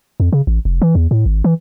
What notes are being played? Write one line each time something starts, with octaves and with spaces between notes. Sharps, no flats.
F2
C#3
A1
F1
E3
E2
A2
G#1
E3